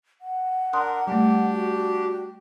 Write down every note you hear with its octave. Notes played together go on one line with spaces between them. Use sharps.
F#5
D4 A#4 C6 D#6 F#6
G3 A3 D4 G4
F#4